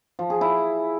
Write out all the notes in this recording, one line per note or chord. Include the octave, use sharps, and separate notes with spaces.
F3
G#4
E4